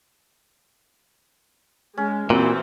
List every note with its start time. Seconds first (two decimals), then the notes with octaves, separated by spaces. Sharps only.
1.98 G#3 C#4
2.30 A#2 E3 C4 F#4